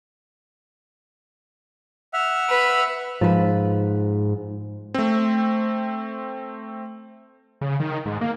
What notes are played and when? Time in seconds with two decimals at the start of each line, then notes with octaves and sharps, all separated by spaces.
2.13 E5 F#5 F6
2.49 B4
3.21 G#2 F3 B4
4.94 A3 C4
7.61 C#3
7.80 D#3
8.06 G#2
8.21 A#3